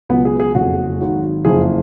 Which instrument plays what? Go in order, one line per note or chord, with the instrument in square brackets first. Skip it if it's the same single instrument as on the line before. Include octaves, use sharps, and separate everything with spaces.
[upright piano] C#2 B2 F#3 B3
G#4
G#4
F#1 F2 C#3 F#4
G#1 G#2 D#3 F#3
F#1 F2 F3 G#4